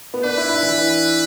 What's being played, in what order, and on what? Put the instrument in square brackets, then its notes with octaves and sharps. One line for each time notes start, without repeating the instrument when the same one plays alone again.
[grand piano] B3
[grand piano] D4 [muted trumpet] B4
[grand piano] E4
E4
E3